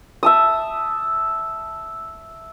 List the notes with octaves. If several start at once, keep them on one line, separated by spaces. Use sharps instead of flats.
E5 A5 D#6